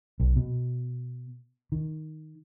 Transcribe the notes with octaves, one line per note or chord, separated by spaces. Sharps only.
B1
B2
D#3